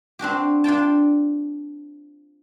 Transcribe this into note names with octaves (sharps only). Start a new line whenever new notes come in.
C4 D4 F#4 G4
D4 F4 G5 A5